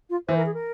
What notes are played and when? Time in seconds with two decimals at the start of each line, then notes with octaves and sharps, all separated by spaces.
0.10 F4
0.28 E3 C5
0.36 A#4
0.46 G#4
0.54 A#4